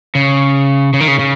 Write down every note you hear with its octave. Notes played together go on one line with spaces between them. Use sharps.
C#3
C#3
D#3
C#3
C#3